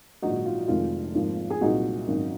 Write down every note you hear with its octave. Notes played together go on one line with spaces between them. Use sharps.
A#1 G#2 D#3 F#3 D#4 F#4
F4
F1 F2 D#3 G#3 F4
G#1 G#2 F3 A#3
G#4
C2 A#2 F#3 D#4 F#4
G#1 F#2 D#3